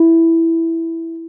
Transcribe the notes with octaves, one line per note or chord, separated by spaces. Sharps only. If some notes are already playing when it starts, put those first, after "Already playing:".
Already playing: E4